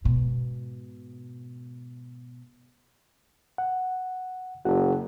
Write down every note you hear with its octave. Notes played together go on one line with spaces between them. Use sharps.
G#2 B2
F#5
F#1 F#4 F#5